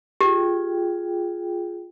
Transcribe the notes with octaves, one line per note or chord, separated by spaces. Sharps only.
F4 G4 G#4 G5